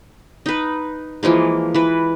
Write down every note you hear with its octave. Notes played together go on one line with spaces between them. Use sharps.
D#4 B4
E3 F3 G#3 A#3
E3 B4